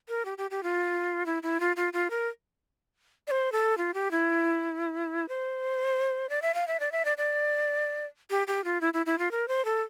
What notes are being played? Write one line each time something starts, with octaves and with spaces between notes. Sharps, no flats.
A#4
G4
G4
G4
F4
E4
E4
F4
F4
F4
A#4
D5
C5
A4
F4
G4
E4
C5
D5
E5
F5
E5
D5
E5
D5
D5
G4
G4
F4
E4
E4
E4
F4
A#4
C5
A4